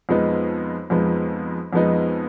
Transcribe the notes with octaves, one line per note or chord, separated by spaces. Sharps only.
F2 F3 G#3 B3 D#4
F2 F3 G#3 B3 D#4
F2 F3 G#3 B3 D#4